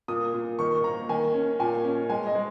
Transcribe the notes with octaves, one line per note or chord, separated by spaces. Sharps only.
A#2 D#6
A#2
D#3 C#6
C#6
A#3 A#5
D#3 G#5
C#4
A#2 G#5
C#4
G#3 G#5
D#5
G#3